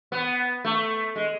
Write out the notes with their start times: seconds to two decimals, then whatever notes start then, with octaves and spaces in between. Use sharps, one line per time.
0.12 B3
0.65 A3
1.16 G#3